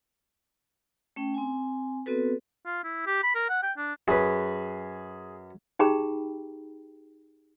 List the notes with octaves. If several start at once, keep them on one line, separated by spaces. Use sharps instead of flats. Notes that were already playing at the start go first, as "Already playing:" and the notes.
A3 C#4 G5
C4 G#5
B3 C4 F#4 A4 B4
F4
E4
G4
B5
A#4
F#5
G5
D4
F#2 G#4 B4
D#4 G4 G#4 G5 A#5 B5